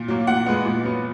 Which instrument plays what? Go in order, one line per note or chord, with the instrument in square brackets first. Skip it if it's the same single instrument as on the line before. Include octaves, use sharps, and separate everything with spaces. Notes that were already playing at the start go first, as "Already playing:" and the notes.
Already playing: [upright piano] A#2
F#3 A#3
A#2 F#5
G#3 B3
A#2
F#3 B3